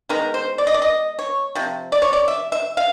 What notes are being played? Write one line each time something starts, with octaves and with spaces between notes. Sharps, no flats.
D#3 G#3 B3 A#4
C5
D5
D#5
D5
D#5
C#5
C3 F3
D5
C#5
D5
E5
E5
F5